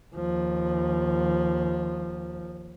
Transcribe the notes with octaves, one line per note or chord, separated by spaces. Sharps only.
D#2 F3